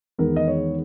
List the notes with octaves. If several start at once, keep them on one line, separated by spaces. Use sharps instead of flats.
E2 D#3 G#3 B3 A#4
D#5
C#5